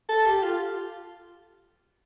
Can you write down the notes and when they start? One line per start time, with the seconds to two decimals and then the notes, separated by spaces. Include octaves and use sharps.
0.09 A4
0.26 G4
0.43 F4